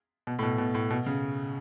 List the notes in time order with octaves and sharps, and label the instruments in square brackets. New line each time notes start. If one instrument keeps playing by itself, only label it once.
[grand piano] B2
A2
B2
B2
A2
B2
C#3